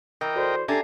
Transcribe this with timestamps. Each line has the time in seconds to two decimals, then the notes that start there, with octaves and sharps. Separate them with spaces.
0.21 E3 A#4 D#5 G5
0.36 F#4 A4 C5 D5
0.68 D4 G4 A4 E5 G#5 A#5 C7